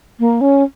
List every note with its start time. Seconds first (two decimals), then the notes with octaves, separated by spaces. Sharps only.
0.20 A#3
0.41 C#4